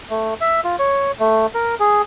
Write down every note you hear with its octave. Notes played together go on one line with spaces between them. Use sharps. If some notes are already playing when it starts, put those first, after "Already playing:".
A3
E5
F4
C#5
A3
A#4
G#4